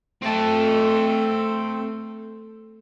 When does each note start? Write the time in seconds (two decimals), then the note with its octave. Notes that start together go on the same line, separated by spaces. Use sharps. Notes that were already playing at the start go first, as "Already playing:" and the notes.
0.22 A3 C4 A4 A5